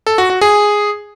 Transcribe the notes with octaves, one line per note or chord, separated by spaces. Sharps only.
A4
F#4
F#4
G#4